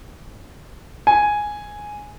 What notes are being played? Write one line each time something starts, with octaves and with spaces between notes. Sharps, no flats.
G#5